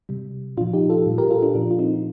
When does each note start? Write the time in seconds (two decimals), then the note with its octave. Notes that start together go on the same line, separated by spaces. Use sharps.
0.09 C3 G3
0.57 A#2 D4 F4
0.61 F3
0.73 D#4 G4
0.90 F4 A4
1.06 A#2 G3
1.18 G4 A#4
1.31 F4 A4
1.42 D4 F4
1.55 A#2 F3 D4
1.71 F4
1.79 C4 D#4